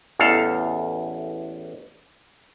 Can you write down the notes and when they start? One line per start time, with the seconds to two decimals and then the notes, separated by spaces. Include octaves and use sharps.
0.19 A1 E2 A4 F5